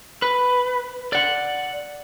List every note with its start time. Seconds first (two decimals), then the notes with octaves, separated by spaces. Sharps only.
0.22 B4
1.13 D5 F#5